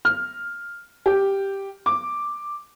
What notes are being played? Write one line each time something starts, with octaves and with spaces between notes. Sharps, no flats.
F6
G4
D6